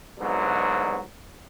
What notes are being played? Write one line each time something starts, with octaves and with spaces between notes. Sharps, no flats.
C2 G#2 B2 D3 F#3